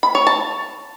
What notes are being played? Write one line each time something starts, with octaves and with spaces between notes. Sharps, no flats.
B5
C#5
A5